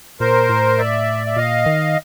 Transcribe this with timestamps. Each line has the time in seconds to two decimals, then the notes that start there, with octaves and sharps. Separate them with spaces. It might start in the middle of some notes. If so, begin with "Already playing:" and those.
0.20 A#2 A#4 C5
0.49 A2
0.78 D5 E5
1.27 E5
1.36 A#2 D#5 F5
1.66 D#3